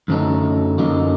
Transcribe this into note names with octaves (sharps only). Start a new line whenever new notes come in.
F#2 D3 F#3 A3 D#4
F#2 D3 F#3 A#3 D#4